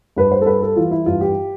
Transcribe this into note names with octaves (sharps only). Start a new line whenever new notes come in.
G2 B4
C5
A4
G3 B4
A4
E3 F4
E4
G2 F4
G4